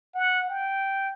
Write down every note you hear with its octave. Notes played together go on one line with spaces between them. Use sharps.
F#5
G5